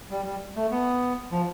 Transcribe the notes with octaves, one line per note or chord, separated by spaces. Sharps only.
G3
G3
A3
B3
F3